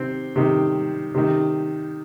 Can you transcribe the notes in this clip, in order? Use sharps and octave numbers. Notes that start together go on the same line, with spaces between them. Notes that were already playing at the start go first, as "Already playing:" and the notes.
Already playing: C3 D#3 C4
C3 D#3
C3 D#3